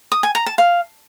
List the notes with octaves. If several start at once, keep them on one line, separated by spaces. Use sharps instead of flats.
D#6
G#5
A#5
A5
F5